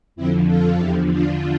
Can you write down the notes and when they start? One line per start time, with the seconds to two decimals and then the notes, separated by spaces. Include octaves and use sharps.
0.16 F2 D3 F3 C4 E4
0.47 F4 A4
0.79 E2 D3 F3 E4 G4
1.10 D4 F4